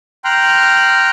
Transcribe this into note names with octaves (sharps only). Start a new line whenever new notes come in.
G5 A#5 C6 F6 F#6